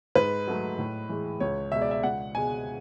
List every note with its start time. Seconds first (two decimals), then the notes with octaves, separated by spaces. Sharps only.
0.15 G#2 B4
0.47 F#3 A3
0.78 A2
1.09 E3 G#3
1.40 C#2 C#5
1.72 B2 G#3 E5
1.82 D5
1.91 E5
2.03 C#2 F#5
2.35 B2 G#3 G#5